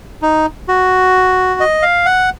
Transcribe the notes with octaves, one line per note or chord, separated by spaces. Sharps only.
D#4
F#4
D#5
F5
F#5